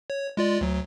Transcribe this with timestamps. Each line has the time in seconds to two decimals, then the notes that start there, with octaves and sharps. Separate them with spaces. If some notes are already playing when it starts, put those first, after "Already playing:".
0.10 C#5
0.37 G#3 F4 D5
0.61 D2 F#3